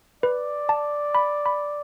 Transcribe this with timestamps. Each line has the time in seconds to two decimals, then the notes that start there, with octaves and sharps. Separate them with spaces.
0.23 B4 D5
0.69 A5
1.15 B5
1.46 B5